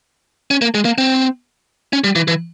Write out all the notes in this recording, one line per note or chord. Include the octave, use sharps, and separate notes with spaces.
C#4
A#3
G#3
A#3
C4
C#4
G3
E3
E3